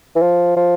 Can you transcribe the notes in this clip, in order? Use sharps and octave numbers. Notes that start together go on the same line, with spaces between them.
E3
F3
F3